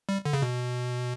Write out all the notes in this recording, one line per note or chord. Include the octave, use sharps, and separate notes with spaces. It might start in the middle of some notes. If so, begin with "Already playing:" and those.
G3
D3
C#3
B2